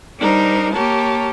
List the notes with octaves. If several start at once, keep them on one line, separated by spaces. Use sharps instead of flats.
G3 D4 D#4 A#4 C5
A#3 G4 A#4 C#5 A5